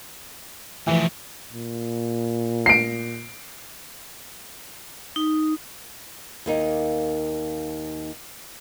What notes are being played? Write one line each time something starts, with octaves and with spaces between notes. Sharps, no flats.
E3 F3 A3
A#2
C7 D7
D#4
D#2 A#3 D#4